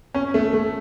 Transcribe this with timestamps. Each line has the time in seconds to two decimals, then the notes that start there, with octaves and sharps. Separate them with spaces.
0.14 C#4
0.34 A3
0.53 A3